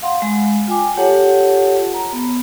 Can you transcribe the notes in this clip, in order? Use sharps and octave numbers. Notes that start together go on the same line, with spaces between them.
F5 F#5 C6
G#3
F4 G5 G#5 D6
F4 G4 A4 C#5 F#5 A5
A#5
B3